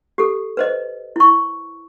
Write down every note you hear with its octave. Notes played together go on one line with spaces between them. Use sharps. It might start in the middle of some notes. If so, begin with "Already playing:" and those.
G4 A4
B4 C5 D#5
E4 C#6